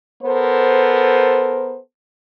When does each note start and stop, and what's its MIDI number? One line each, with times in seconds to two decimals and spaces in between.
0.23 1.78 59
0.23 1.78 69
0.23 1.78 70
0.23 1.78 72